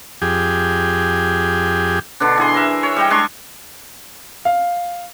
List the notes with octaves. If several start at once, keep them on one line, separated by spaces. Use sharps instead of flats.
F2 G4 G#4
B2 D3 D4
E3 G#4 C6
A#4 E5
C#5
G3 D#5 G5
G#3 D4 C6 C#6
F5